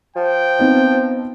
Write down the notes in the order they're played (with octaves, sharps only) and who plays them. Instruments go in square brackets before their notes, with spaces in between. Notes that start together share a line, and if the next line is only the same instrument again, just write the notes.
[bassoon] F3 [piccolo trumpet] G5
[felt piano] B3 C4 D#4